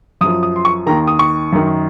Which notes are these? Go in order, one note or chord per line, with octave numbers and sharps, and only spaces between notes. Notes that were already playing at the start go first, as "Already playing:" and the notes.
F#2 F3 D#6
D#6
C6
C#6
D#2 D#3 A#5
D#6
C#6
F#2 D#3